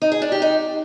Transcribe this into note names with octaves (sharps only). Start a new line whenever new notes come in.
D#4
G#4
D4
G4
D#4